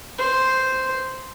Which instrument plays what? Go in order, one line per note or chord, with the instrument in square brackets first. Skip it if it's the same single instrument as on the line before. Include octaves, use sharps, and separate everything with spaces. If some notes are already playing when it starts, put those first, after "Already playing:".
[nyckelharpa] C5